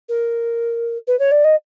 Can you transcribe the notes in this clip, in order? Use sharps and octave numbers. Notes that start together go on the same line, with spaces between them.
A#4
B4
C#5
D5
D#5